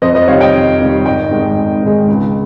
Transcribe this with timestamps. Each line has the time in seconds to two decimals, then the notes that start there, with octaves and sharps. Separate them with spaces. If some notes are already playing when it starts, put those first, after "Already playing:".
0.02 F2 C5 D#5
0.15 C5 D#5
0.28 C3 D#3 G3 C#5 F5
0.41 D#5 G5
0.54 F2
0.80 C3 D#3 G3
1.05 G#1 D#5 G5
1.31 G#2 D#3 G#3
1.57 G#1
1.82 G#2 D#3 G#3
2.08 C#2